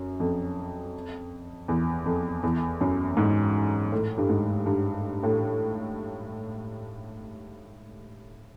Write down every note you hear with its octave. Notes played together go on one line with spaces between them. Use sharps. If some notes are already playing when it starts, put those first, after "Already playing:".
Already playing: F#2
F2
E2
F2
E2
F#2
G#2
A2
G2
G#2
G2
A2